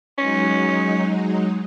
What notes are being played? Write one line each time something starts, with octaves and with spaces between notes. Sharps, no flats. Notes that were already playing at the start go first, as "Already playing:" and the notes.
F#3 G#3 C#4 D#4